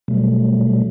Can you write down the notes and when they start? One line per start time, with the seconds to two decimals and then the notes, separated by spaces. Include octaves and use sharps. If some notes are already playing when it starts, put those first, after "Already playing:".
0.08 B2 F#3 G3 A3